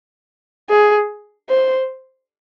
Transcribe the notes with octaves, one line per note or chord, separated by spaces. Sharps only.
G#4
C5